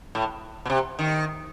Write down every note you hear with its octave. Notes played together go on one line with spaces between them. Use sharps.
A2
B2
C3
D#3